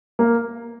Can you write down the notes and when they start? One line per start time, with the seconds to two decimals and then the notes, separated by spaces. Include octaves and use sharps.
0.19 A#3